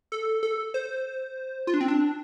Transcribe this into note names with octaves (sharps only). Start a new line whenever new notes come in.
A4
A4
C5
F4
D4
C4
D4